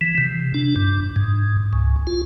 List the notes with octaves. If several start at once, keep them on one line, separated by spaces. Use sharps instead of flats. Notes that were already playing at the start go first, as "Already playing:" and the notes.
E3
C3
D4
G2
G#2
C#2
F4